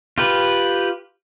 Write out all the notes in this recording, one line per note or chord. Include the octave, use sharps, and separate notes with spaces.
F4 G4 B4